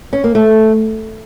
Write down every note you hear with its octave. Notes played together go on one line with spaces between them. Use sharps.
C#4
A#3
A3